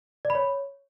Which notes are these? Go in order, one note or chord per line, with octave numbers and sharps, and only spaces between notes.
D5
B5
C#5